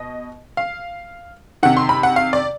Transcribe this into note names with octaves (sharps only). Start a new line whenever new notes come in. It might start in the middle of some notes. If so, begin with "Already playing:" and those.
Already playing: B2 D#5
F5
C3 D#3 F#5
C6
B5
F#5
F5
D5